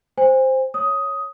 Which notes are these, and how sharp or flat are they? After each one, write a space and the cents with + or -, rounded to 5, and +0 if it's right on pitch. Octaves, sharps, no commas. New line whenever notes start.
C5 +0 G#5 -40
C#5 +0 D#6 +10